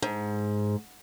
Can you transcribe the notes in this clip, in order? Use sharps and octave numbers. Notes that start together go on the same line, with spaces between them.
G#2